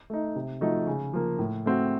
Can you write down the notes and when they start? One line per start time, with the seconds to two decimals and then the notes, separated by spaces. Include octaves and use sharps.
0.10 A3 D#4
0.36 C3
0.61 F3 A3 D#4 F#4
0.87 C#3
1.13 F3 A#3
1.39 A2
1.66 A3 C4 F#4